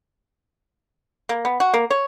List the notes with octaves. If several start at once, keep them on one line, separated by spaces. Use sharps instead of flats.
A#3
B3
F#4
A#3
C#5